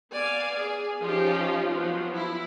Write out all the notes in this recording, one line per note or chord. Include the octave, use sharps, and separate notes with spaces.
B3 D5 F5 G#5
G#4
F3 C#4 D#4 F4 G4
F3 F#3 B3
E4